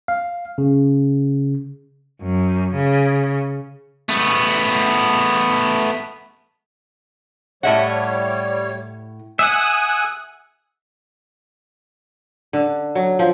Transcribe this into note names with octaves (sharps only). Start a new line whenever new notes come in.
F5
C#3
F#2
C#3
A3 B3
A2 G3 C#5 E5 F#5
E5 F#5 G#5 D#6 F#6
D3
F#3
F3